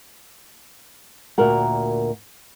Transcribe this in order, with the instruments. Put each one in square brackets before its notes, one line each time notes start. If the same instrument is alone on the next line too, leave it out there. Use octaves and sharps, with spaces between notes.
[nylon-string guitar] D2 A#2 F#4 A#4 F#5